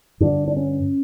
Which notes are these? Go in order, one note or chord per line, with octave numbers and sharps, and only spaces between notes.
G2 D3 D4
D4
C#4